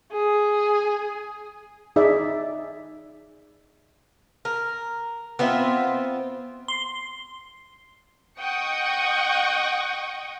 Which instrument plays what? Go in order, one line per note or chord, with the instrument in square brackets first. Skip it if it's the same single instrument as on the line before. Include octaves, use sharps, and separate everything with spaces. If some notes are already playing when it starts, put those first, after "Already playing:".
[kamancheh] G#4
[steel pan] D#4 G#4 D5 E5
[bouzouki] A#4
B3 C4 F4 E5
[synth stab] C6
[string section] D#5 F#5 G5 C#6 D#6